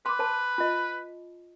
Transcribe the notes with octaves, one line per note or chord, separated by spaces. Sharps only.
B4 C6 D6
C5 A5
F4 D#5